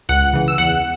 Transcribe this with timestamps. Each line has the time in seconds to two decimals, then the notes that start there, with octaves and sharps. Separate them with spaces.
0.09 C#2 F#5 F#6
0.33 C#3 E3
0.48 E6
0.58 E2 F#5 F#6